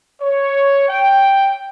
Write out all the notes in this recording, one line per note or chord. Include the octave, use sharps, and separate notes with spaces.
C#5
G5